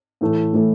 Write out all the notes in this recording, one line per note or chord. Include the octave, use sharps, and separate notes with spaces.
A2 E3 A3 E4 A4
A2 E3 A3 E4 A4